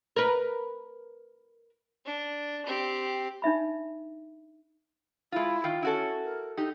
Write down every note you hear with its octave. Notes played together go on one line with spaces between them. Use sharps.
A#4 B4
D4
C4 G4
D4 D#4 E5 B5
G#3 E4 F4
D#3 F4 G5
C#4 E4 F#4 A4
A#4
D#4 G4 A4